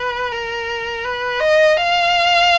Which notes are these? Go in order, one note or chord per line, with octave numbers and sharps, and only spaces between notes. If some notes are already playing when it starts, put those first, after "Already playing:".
Already playing: B4
A#4
B4
D#5
F5